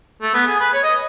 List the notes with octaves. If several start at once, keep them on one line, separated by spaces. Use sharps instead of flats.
A3
B3
G#4
B4
C#5
D#5